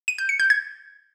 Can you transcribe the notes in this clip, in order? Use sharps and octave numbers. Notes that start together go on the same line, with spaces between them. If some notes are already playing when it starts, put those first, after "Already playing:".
D#7
G6
C#7
G6
G#6